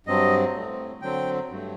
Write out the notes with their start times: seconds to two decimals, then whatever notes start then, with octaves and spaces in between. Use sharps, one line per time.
0.07 G2 F#3 C4 D#5
0.54 A2 A3 C4
1.02 D3 F#3 C4 G5
1.49 G2 F#3 A3